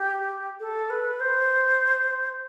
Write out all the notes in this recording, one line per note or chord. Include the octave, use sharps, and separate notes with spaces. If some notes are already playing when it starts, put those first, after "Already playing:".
Already playing: G4
A4
B4
C5